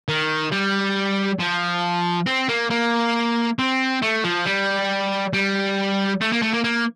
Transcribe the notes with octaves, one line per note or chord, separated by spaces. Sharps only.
D#3
G3
F3
C4
A#3
A#3
C4
A3
F3
G3
G3
A3
A#3
A3
A#3
A#3